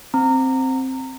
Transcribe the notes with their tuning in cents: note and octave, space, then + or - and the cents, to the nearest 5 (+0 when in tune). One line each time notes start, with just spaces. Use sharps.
C4 +0 A#5 -25